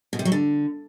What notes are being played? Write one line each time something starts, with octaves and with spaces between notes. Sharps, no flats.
B2
C3
F#3
D3